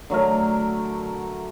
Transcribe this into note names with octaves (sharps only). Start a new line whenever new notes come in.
D3 F#3 A3 A#4